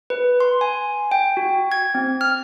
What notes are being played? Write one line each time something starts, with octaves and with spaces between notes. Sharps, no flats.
B4
C6
G#5
G5
F#4
G#6
C4
F6